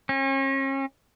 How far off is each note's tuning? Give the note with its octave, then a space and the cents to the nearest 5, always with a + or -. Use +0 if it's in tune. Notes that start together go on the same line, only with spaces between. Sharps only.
C#4 -40